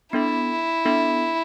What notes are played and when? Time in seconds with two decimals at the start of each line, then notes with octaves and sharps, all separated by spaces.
0.13 B3 D4 E4 A4 E5
0.85 B3 D4 A4 E5